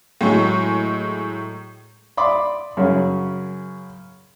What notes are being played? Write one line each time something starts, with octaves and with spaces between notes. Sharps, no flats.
A2 F#3 G#3
D5 B5 C6 D6 D#6
F#2 C#3